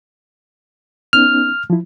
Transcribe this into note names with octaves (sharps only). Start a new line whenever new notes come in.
B3 C#4 D#4 F6
F3 E4